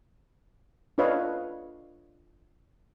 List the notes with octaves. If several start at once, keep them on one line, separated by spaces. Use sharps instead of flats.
D4 F4 B4 C#5 D#5 F5